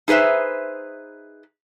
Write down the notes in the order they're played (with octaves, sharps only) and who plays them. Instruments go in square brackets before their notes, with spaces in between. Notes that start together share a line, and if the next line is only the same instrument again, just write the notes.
[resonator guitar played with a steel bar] D#4 G#4 B4 C5 E5